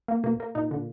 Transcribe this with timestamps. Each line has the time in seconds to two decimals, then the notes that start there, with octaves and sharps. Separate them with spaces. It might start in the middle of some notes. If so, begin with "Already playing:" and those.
0.08 A#3
0.24 B2 A#3
0.40 A#3
0.55 A#2 D#4
0.71 D3